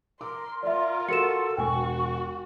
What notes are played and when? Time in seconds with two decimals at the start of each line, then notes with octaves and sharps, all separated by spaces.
0.21 A#4 C6 D6
0.63 F4 A#4 D5 E5
1.09 F#4 A4 A#4 C#7 E7
1.57 E1 F#4 G5 G#5 C#6